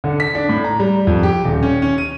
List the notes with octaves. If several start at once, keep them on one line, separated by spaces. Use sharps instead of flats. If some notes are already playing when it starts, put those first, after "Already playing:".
D3
B6
D4
A2
A#5
G3
F2
G4
D#1
C#4
C#4
D#7